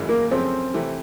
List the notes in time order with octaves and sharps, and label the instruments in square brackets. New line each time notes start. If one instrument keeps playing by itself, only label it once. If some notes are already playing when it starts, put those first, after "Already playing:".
Already playing: [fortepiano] G#1 F#2 C#3 E3 G#3
[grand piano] A#3
[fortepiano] F#2 C#3 F3 A3 [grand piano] C4
[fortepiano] C3 E3 A3